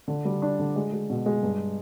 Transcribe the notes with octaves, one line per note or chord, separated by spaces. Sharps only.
D3
G3
D4
D3
G#3
G#3
B2
G#3
G2